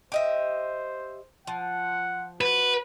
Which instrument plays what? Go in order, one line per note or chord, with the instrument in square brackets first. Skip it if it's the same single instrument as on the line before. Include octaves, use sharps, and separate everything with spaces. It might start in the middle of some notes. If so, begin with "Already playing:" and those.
[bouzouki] G4 D#5 E5 [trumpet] C5
[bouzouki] F3 [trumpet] F#5
[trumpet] F#4 [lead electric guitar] B4